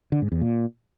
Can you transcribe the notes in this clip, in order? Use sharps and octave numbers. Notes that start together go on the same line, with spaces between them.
D3
G#2
E2
A#2